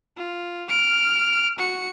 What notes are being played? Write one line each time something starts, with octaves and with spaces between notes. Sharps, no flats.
F4
F6 D7
F#4 C#7